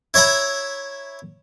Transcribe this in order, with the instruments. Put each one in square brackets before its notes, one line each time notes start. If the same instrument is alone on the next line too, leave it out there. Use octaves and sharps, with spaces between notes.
[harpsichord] E4 C#5 E5 A#5 B5